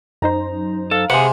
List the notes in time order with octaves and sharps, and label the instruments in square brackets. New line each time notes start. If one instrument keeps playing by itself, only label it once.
[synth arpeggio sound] F#2 D#4 C5 [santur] A#5
[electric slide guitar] A4 [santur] F5
[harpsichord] C3 [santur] G#3 C6 [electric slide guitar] G#4 F#5 [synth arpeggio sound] B4